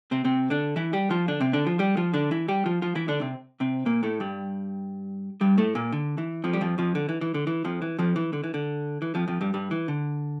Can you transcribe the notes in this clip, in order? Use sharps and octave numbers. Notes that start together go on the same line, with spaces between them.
C3 C4
C3 C4
D3 D4
E3 E4
G3 G4
F3 F4
D3 D4
C3 C4
D3 D4
F3 F4
G3 G4
F3 F4
D3 D4
E3 E4
G3 G4
F3 F4
F3 F4
E3 E4
D3 D4
C3 C4
C3 C4
A#2 A#3
A2 A3
G2 G3
G2 G3
A2 A3
A#2 A#3
D3
E3
F2 F3
G3
F2 F3
F2 F3
D3
E3
E3
D3
E3
F2 F3
E3
F2 F3
E3
D3
E3
D3
E3
F2 F3
F2 F3
G2 G3
G2 G3
E3
D3